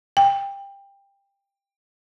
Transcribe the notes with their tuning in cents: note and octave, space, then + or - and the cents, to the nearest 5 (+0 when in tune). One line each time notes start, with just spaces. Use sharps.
G5 +20